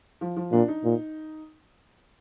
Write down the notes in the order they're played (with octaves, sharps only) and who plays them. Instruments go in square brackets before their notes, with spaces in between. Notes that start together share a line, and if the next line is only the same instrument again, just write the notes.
[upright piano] F3
F3
[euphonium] A#2 [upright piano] D4
[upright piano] D#4
[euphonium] A#2